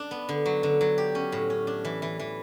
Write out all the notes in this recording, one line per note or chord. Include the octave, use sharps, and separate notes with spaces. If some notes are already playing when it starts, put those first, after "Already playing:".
Already playing: D4
B3
D3
F#3
D3
F#3
G4
C#4
A2
C#4
D4
E3
E3
E3